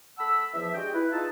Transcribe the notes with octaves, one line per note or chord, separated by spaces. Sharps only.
A3 F#5 A5 B5 E6
E2 F3 E5
G#3 D4 F#4 G4 D#5 G5
E4 B4
D#4 F4 G#4 B4 E5 A5